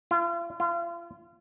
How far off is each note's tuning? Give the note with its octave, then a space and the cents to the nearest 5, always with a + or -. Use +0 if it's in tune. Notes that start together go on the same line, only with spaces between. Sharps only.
F4 -40
F4 -35